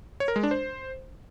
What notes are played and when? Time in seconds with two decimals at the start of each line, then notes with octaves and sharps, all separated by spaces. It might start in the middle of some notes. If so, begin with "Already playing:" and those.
0.20 C#5
0.28 A#4
0.36 G#3
0.43 D4
0.51 C5